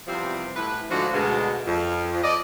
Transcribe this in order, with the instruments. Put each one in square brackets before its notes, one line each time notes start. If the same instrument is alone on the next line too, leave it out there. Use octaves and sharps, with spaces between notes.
[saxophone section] E2 C3 F3 G3 C4
A2 E3 B4
G#2 D3 F3 D4 F4 F#4
D2 B2 G#3
F2
D5 D#5